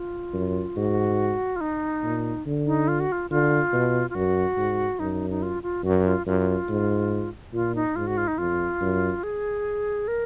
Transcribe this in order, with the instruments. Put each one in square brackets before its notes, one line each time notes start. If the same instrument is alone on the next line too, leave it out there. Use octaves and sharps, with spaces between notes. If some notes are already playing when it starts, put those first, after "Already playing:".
Already playing: [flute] F4
[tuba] F#2
[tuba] G#2 [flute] F#4
[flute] F4
D#4
[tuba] A#2
D3
[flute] D#4
F4
F#4
F4
[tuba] D3 [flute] F4
[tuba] B2
[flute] F4
[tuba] F#2 [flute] F#4
[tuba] G#2
[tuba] F#2 [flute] D#4
[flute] D#4
F4
F4
[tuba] F#2 [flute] F#4
[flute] F4
[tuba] F#2 [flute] F4
[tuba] G#2
[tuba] A#2 [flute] F4
[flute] D#4
[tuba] G#2 [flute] F4
[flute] F#4
F4
D#4
[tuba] F2 [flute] F4
[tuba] F#2
[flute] G#4
A#4